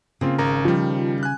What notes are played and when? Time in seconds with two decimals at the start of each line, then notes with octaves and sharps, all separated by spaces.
0.21 C#3 A#3 C4 F4
0.38 G#1 A#4 A#5
0.65 D#3 F3 G3
1.23 G#5 F#6